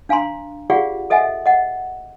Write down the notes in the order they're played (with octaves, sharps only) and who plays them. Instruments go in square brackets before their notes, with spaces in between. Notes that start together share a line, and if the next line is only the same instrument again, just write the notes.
[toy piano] D4 F5 G#5 A#5 C6
F4 G4 G#4 D5 F5 F#5
A4 D#5 E5 F#5 G#5
D#5 F#5